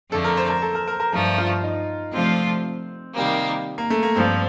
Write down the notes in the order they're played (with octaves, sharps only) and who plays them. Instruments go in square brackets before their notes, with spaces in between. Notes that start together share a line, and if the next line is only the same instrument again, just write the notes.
[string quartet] F2 D3 F3 A3 [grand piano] A4
[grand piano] A#4
C5
A#4
A4
A#4
A#4
A#4
[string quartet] G2 F3 A3 [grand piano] A#4
[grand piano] F4
D#4
[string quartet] C3 F3 A3 D4 F4 [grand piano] C4
[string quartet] C3 D#3 G3 A#3
[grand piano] A#3
A3
A#3
[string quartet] G2 F3 [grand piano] C4